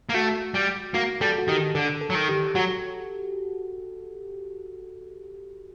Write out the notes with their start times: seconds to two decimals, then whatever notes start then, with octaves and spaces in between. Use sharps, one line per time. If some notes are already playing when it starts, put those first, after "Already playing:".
0.09 A#3
0.14 A3 F#4
0.54 G3
0.94 A#3 F#4
1.21 G3 A4
1.38 F#4
1.48 D#3 G4
1.75 D3 A4
2.01 A4
2.10 F#3
2.15 D#3
2.29 G4
2.55 F#3 F#4